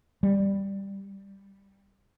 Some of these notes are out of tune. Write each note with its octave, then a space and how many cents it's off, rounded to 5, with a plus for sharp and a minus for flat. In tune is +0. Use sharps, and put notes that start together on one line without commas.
G3 +5